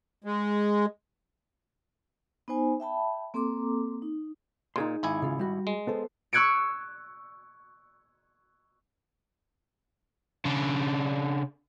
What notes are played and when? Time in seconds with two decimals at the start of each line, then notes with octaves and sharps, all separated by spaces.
0.24 G#3
2.48 B3 D#4 C5 G#5
2.80 E5 G5 A5 B5
3.34 A#3 C4 A4 A#5 C6 D6
4.02 D#4
4.76 A#2 D#4 G#4 C6
5.03 G#1 E4 G#5
5.22 C#3 F4
5.39 G3 F#4
5.67 G#3
5.87 B3 A4 C5
6.33 C#6 E6 F#6 G#6 C#7 D7
10.45 C#3 D4